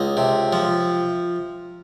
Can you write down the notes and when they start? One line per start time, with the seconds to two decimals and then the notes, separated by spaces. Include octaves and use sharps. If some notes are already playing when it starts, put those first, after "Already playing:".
Already playing: C#2 D#5
0.17 C3
0.53 F3